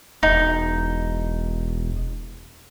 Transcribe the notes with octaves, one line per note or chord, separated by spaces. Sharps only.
E1 D#4